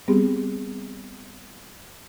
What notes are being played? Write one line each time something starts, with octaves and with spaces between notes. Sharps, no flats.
G3 B3 C4 G4 G#4